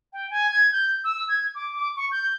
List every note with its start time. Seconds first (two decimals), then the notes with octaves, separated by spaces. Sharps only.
0.13 G5
0.30 G#5
0.51 G#6
0.72 G6
1.04 E6
1.29 G#6
1.55 D6
1.76 D6
1.96 C#6
2.12 G6